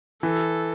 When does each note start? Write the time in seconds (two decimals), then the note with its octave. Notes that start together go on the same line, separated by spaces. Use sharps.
0.23 E3 A4